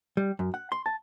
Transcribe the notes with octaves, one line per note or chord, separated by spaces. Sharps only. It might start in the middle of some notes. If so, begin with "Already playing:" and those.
G3
F#2
F#5
C6
A5